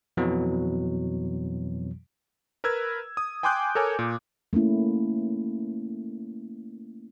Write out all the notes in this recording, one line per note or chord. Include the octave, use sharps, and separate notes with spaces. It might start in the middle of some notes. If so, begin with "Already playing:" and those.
F2 B2 E3 F#3
A#4 B4 E6 G#6
D#6
G5 G#5 C6 D6 F#6 G6
A4 A#4 C#5 G#5
A#2
A3 A#3 C#4 E4